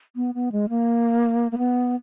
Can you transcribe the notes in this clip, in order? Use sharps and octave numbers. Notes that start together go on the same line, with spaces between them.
B3
B3
G#3
A#3
A#3
B3